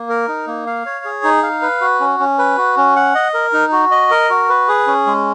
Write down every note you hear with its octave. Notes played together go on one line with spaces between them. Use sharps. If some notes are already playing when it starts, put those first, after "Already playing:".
Already playing: A#3
A#4
D#4
A#3
F5
C#5
G#4
D#4
F5
B4
F#4
C#4
C#4
B4
F#4
C#4
F#5
D#5
A#4
D#4
F#4
D#5
A#4
F#4
B4
G#4
C#4
G#3